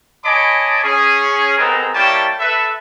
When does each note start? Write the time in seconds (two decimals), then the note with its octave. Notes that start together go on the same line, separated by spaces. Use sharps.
0.24 C#5 D#5 G#5 A5 B5 D6
0.84 C#4 G#4
1.58 G#3 B3 C4 D#4 A4 A#4
1.94 G3 A#3 E4 C#5 G5 A5
2.40 A4 B4 E5